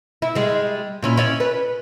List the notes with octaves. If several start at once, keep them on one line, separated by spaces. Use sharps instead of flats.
E4
G3 G#3
A#2 C#4 E4
C#4 D5 E5
B4